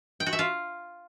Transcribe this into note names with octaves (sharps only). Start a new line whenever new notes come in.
G5
F#4
E5
F4